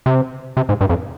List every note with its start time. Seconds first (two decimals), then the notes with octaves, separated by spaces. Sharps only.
0.06 C3
0.57 C3
0.69 G#2
0.81 G2
0.89 F2